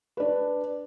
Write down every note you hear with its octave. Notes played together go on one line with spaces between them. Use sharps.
D4 B4